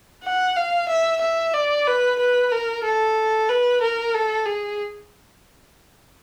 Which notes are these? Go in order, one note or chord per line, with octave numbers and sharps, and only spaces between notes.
F#5
F5
E5
E5
D5
B4
B4
A#4
A4
B4
A#4
A4
G#4